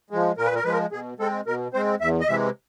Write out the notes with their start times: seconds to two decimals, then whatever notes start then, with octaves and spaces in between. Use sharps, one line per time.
0.10 F3 G#3
0.37 A#2 A#4
0.46 B4
0.55 A#4
0.64 F3 G#3 B4
0.72 A#4
0.92 B2 G#4
1.19 G#3 C4 A4
1.46 B2 A#4
1.73 G#3 C4 C5
2.00 E2 E5
2.20 D#5
2.28 C3 E3 G#3 E5